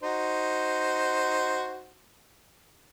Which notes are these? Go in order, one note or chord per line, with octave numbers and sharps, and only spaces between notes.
D#4 F#4 C5